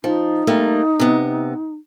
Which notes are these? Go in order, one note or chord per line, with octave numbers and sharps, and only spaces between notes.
F3 D#4
G3 A3 A#3
C3 B3